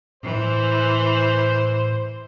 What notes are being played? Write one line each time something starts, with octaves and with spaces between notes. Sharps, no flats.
A2 E3 C5